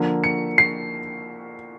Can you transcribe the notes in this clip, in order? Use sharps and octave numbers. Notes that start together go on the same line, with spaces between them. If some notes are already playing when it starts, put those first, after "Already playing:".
Already playing: D3 F3 A#3
C#7
C7